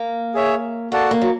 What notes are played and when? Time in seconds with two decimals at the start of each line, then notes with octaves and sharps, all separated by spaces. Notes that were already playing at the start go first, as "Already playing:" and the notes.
Already playing: A#3
0.34 G#4 C#5 E5
0.92 A#3 F#4 A4 D5 F#5 A5
1.11 A#3
1.21 F#3